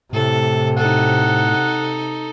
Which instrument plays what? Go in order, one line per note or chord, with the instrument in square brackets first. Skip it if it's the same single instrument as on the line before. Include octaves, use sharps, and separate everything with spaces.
[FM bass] A2 [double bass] C3 [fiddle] A4
[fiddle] D#4 A4 [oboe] F#5